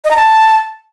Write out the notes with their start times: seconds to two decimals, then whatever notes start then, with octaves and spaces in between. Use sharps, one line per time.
0.05 D#5
0.11 A#5
0.17 A5